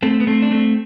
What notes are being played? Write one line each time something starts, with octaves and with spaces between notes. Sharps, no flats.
A3 C4
B3
A3 C4
D4
A3 C4